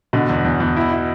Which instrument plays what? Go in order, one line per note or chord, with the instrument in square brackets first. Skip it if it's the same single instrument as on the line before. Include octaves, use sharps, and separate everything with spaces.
[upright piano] B2 [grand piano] D3
[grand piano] E2
E2
E2
E4
E4